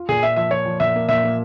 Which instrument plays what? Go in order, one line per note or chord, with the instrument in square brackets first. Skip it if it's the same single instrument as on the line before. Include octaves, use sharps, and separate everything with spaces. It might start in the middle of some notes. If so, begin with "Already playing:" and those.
Already playing: [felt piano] F4
[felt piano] A#2 [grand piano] G#4
[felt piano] A#3 [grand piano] E5
[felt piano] F3 [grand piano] E5
[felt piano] F3 [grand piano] C#5
[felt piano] F3
[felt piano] A#2 [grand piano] E5
[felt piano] A#3
[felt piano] A#2 [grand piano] E5
[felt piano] A#3